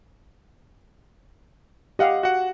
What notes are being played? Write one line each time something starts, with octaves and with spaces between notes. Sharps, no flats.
G4 D#5 F5 F#5
F#4 F#5